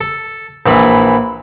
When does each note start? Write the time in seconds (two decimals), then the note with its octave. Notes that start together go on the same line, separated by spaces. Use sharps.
0.01 A4
0.66 A#1 E3 B5